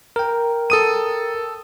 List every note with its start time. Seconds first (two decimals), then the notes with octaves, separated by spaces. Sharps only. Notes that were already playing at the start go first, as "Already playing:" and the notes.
0.16 A#4 G5
0.70 A4 D#6 D#7